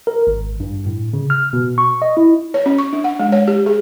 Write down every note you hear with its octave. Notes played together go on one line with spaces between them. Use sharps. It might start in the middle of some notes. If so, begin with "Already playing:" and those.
A#4
G#1
G2
A2
C#3
F6
B2
C#6
D#5
E4
C#5
C#4
C#6
D4
F#5
G#3
C#5
G4
G#4